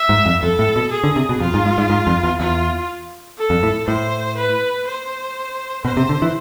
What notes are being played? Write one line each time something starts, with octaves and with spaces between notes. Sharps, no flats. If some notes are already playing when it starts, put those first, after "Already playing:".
Already playing: E5
G#2
F2
F2 A4
A2
B2
G#4
D3
C3
B2
F2 F4
G#2
G#2
G#2
G#2
F2
E2
E2 F4
A4
F2
A2
A2 C5
B4
C5
B2 C5
C3
D3
E3